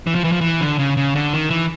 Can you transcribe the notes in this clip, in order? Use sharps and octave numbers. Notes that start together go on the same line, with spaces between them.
E3
F3
E3
F3
E3
D3
C#3
C#3
D3
D#3
E3